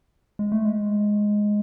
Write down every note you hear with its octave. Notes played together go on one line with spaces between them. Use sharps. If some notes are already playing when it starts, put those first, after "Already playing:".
G#3
A3
G#3